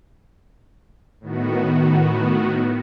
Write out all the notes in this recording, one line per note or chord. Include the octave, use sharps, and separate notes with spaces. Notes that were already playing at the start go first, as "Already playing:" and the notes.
A2 D#3 B3 F#4